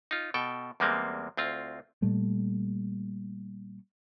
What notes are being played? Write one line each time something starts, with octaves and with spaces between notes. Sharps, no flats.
D#4 F4
B2 A4 G5
E2 G3 G#3 A#3 C4
D2 C4 F4
A#2 G3 A3